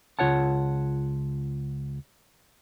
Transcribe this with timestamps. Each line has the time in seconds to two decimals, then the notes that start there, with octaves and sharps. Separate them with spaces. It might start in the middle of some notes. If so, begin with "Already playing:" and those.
0.19 C#2 F4 C#5 F#5 A5